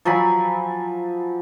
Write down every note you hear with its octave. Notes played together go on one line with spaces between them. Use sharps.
F3 F#3 G#5 B5